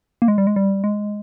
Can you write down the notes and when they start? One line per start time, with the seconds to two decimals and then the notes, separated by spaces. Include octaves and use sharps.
0.22 A#3
0.28 G#3
0.38 G3
0.47 G#3
0.56 G3
0.84 G#3